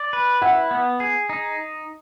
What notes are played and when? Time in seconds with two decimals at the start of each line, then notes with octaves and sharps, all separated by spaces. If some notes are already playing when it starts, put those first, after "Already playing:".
Already playing: D5
0.13 B4
0.42 E4 F#5
0.71 B3
1.00 G#4
1.29 D#4